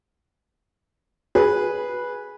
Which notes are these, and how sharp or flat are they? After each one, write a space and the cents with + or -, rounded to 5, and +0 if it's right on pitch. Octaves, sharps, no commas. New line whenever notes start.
G#4 +0 B4 -10